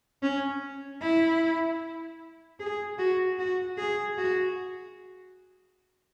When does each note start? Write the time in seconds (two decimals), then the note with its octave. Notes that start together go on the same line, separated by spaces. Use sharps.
0.23 C#4
1.02 E4
2.60 G#4
2.99 F#4
3.39 F#4
3.78 G#4
4.18 F#4